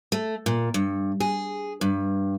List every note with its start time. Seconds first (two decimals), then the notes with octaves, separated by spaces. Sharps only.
0.12 A3
0.46 A#2
0.74 G2
1.20 G#4
1.81 G2